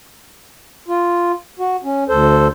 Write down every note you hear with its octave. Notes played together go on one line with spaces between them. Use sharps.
F4
F#4
C#4
D2 A4 C5